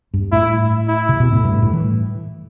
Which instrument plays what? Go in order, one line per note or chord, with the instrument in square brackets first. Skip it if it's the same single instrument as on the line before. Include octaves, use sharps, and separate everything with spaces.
[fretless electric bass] G2
[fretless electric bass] A2 [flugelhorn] E4
[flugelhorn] E4
[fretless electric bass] C3
B2
A2
G2
A2
E3